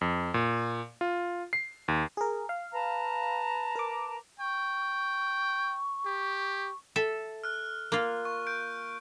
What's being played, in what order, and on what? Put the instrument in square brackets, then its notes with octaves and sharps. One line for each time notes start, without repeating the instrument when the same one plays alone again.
[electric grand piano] F2
A#2
F4
C7
D#2
[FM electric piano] G#4 A#4
F5
[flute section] B4 A5 A#5
[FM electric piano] A#4 D6
[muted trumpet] G5 [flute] C#6
[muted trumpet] G4
[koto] A4 E5
[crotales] F6 F#6
[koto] A#3 F4
[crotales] C#6
G6 D7